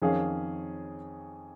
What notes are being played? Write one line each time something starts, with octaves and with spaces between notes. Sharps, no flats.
F2 D#3 C#4 G#4 F5